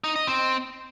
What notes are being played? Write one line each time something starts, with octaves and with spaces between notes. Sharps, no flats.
D#4
D#5
C4